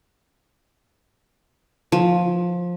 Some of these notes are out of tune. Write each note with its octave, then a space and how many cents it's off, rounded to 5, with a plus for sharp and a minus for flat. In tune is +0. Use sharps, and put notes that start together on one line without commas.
F3 +15